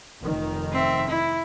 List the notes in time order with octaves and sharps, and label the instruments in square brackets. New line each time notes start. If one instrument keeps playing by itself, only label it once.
[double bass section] F1 D#3
[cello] C4 E5
E4